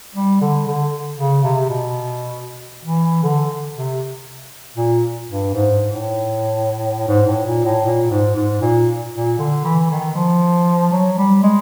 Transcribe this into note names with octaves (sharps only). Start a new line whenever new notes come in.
G3
D3
D3
C#3
C3
B2
E3
D3
C3
A#2
G2
G#2
A2
G#2
A2
A#2
A2
A#2
G#2
G#2
A#2
A#2
D3
E3
D#3
F3
F#3
G3
G#3